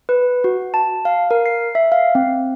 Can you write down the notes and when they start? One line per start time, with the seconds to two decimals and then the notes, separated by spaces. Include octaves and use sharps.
0.09 B4
0.44 F#4
0.74 A5
1.05 F5
1.31 A#4
1.46 C7
1.75 E5
1.92 F5
2.15 C4